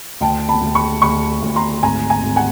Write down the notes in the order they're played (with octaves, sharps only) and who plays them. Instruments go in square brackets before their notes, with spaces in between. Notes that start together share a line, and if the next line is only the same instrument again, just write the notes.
[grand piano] D2 [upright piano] G5 A5
[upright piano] A5 B5
[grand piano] D2
[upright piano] B5 C#6
[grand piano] D2 [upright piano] B5 C#6
[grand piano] D2
[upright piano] A#5 C6
[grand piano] G#1 [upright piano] G#5 A#5
[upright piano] G#5 A#5
[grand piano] G#1
[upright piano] F#5 G#5